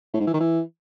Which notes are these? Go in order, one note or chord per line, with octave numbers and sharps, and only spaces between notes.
A2
G#2
E3
D#3
E3